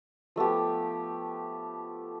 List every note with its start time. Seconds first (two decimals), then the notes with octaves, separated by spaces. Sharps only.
0.36 F3 A3 B3 G4